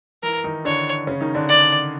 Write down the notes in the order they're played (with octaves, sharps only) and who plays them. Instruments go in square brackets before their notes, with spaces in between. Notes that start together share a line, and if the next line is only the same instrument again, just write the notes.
[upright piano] E3 E4 [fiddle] A#4
[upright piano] D#3 D#4
[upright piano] D3 D4 [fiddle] C#5
[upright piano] C#3 C#4
D#3 D#4
D3 D4
[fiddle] D5